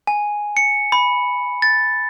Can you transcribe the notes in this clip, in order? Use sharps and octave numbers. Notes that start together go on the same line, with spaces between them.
G#5
C#7
B5
A6